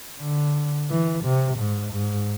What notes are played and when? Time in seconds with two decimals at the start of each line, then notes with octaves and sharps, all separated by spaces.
0.20 D3
0.90 E3
1.25 C3
1.59 G#2
1.93 G#2